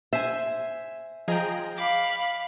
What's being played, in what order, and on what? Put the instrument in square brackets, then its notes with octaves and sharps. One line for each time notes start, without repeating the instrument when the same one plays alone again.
[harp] C5 G#5 [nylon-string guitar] E5
[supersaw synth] F3 G#4 A#5 [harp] D#5 G5
[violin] F5 B5 [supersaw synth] D6